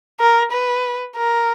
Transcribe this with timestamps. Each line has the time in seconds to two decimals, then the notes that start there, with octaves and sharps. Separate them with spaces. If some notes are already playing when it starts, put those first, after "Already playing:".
0.20 A#4
0.52 B4
1.16 A#4